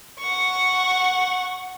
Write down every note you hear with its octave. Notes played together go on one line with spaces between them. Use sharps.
F#5 C#6